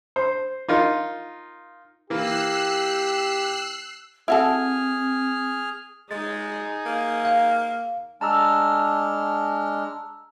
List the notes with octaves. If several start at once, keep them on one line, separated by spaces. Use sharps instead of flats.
C5
D#4 F4 A#4
E3 A#3 G4 E6 F#6 C7
C4 E4 F#4 G#4 A4 F6
G#3 D#4 G#4 A6
A#3
F5
G#3 D4 A5 A#5 E6 F6